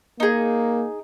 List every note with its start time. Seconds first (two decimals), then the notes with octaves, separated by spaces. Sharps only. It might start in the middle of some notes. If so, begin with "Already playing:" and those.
0.20 A#3 D#4 G#4